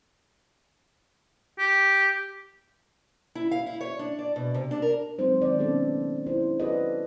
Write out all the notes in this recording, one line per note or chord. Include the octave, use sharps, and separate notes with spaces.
G4
E4
F5
E4
C#5
D4
D5
B2
C3
D4
A#4
F#3 G#3 C4 D#4 C5
D#3 D5
A#3 B3 C#4 D#4 A4
D4 E4 C5
F#4 A4 B4 D5 D#5